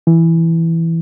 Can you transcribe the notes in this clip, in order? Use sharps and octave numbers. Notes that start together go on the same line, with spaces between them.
E3